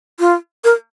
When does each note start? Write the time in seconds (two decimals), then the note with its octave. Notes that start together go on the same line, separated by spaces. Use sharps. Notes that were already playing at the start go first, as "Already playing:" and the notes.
0.20 F4
0.64 A#4